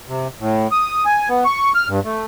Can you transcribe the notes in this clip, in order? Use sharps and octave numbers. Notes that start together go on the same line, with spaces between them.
C3
A2
D#6
G#5
B3
C#6
F6
G2
A3